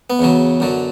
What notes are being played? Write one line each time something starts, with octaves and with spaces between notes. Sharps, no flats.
B3
E2 C#3 F#3
F#2 D3 F#3